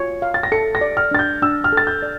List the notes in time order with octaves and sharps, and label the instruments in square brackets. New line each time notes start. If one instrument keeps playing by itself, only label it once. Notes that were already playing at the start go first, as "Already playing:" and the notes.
Already playing: [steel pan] F4 C#5
F5
[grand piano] A6
A#6
[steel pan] A4 [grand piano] C#7
[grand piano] A#6
[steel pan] D5
[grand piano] F6
[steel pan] D4 [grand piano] A6
[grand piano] G6
[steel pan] D4 [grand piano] E6
[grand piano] F6
[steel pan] A4 [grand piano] A6
[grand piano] G6
[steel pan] D5